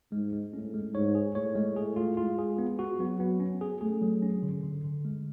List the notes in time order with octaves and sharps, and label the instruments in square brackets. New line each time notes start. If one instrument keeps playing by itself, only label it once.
[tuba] G#2 [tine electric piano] G#3
[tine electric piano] G#3
[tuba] A2 [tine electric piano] C#4
[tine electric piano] G#3
[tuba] G#2 [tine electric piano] C#5
[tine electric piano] G#4
[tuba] A2 [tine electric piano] C#5
[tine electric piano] G#3
[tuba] A2 [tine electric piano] G#4
[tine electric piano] F4
[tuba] G#3 [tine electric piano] F4
[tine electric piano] G#4
B3
F#4
[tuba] F#3 [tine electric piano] B3
[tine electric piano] B3
C#4
G#4
[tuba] A3 [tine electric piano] G#4
[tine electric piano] F#3
C#4
D3
D3
D3
G#3